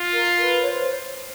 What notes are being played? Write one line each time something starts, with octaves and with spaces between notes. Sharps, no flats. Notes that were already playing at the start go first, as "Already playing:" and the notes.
Already playing: F4
A#4
B4
C#5
C5